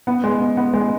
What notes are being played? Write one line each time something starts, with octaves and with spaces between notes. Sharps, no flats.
B3
G#3
B3
B3
G#3